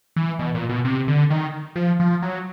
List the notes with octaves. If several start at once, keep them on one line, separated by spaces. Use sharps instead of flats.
E3
B2
A#2
B2
C3
D3
D#3
F3
F3
F#3